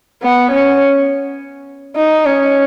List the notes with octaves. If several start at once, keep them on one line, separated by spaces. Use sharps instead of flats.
B3
C#4
D#4
C#4